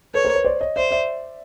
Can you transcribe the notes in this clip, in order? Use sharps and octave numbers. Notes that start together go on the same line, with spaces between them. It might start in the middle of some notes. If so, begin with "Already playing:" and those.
A4 B4 C#5
A#4 C5
B4 C#5
C5 D5
C#5 D#5
C5 D5 E5
D5 E5